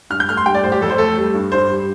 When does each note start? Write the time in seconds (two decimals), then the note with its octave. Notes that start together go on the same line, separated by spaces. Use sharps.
0.10 G2 F6
0.20 G6
0.29 A3 F6
0.37 C6
0.46 G3 G5
0.55 D5
0.63 A2 C5
0.72 G4
0.81 F2 A4
0.90 C5
0.98 A3 A4
1.17 G3
1.34 G2
1.52 G2 C5
1.70 G3